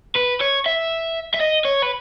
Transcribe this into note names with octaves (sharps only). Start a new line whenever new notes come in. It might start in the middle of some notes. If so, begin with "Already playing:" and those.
B4
C#5
E5
E5
D#5
C#5
B4